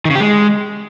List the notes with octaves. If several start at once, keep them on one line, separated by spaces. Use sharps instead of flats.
D#3
C#3
G4
G#3